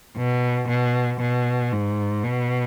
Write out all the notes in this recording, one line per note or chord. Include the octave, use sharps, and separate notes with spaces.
B2
B2
B2
G#2
B2